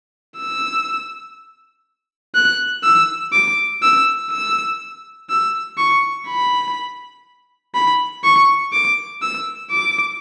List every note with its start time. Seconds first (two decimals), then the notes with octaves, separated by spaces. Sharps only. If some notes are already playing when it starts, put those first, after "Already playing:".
0.38 E6
2.35 F#6
2.84 E6
3.33 D6
3.82 E6
4.31 E6
5.30 E6
5.78 C#6
6.28 B5
7.75 B5
8.24 C#6
8.73 D6
9.22 E6
9.71 D6